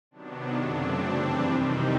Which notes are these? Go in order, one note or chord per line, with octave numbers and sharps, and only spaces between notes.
C3 D#3 F#3 B3 D4
F#2 C#3 F#3 A3 C4 D4
G2 E3 G3 C4
F2 C3 D#3 G3 C4 D#4